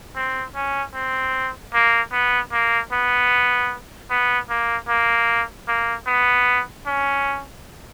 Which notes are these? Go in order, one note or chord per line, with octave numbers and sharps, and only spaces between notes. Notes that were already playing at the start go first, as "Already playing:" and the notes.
C4
C#4
C4
A#3
B3
A#3
B3
B3
A#3
A#3
A#3
B3
C#4